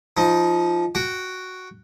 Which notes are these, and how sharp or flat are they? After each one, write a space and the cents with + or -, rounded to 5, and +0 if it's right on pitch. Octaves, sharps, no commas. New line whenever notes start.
F3 -5 D#4 +10
F#4 +0 G5 -15